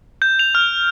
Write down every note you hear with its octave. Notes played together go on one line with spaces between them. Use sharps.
G6
F7
F6